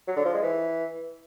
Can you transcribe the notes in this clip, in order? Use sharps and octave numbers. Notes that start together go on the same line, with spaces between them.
F#3
D3
F3
G#3
E3